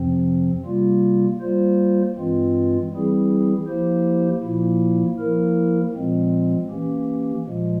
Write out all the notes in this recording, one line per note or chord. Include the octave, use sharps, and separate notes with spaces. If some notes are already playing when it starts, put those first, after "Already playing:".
Already playing: F2 C3 F3 C4
C3 G3 A#3 F4
G3 A#3 F4 C5
G2 E3 G#3 C4 F4
E3 G3 C4 E4 G#4
F3 A#3 E4 G4 C5
A#2 F3 A#3 E4
F3 A#3 E4 A#4
A#2 F3 G#3 C4
E3 A#3 C#4 G4
A#2 F3 G#3